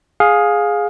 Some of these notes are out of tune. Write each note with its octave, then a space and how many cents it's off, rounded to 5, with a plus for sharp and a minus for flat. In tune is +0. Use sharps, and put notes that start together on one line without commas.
G#4 +0 F5 +20